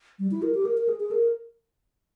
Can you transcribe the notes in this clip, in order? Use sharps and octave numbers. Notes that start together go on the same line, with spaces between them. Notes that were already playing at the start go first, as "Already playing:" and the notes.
G3
E4
A#4
G4
A#4
A#4
G#4
G#4
A#4